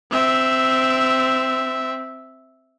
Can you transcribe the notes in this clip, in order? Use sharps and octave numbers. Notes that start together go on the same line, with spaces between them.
C4 E5